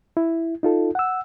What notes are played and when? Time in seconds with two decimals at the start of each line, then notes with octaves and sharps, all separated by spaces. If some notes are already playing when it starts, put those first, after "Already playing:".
0.17 E4
0.63 D#4 F4 A4
0.95 F#5 E6